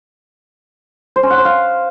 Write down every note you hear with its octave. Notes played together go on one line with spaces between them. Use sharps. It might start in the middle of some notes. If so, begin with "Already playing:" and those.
C5
C#4
F#5
C5
F5